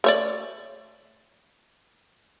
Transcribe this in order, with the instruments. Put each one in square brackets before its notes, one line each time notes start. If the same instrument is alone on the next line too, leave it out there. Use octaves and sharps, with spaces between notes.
[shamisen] A3 C#5 D5